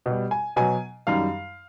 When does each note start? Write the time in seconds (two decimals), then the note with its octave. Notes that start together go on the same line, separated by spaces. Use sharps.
0.06 B2 G3
0.31 G#5
0.56 B2 F#3 G#5
1.07 F#2 D#3 G3 F5